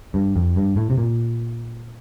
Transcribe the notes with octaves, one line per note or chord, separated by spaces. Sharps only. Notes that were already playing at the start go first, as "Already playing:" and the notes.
G2
F2
G2
A2
C3
A#2